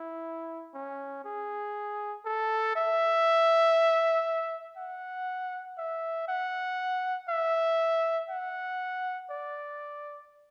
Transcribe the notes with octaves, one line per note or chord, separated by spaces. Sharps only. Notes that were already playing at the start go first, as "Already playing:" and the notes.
Already playing: E4
C#4
G#4
A4
E5
F#5
E5
F#5
E5
F#5
D5